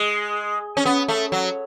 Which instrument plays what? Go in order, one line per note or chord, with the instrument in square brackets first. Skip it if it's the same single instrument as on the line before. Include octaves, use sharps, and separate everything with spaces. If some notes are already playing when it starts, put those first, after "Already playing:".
Already playing: [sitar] G#3
C#4
B3
A3
F#3